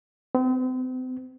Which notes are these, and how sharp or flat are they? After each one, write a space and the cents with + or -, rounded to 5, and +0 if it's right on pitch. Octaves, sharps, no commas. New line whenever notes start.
C4 -40